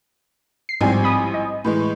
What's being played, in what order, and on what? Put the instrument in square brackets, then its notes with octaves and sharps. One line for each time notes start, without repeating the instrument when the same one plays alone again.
[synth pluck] C7
[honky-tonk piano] A1 F3 G#5 [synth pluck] G#2 G3 C4
[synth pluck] B5 D#6
D#5
[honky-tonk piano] A2 E3 G#3